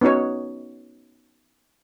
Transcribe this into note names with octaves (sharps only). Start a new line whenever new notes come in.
B3 C#4 D#4 F#4 C#5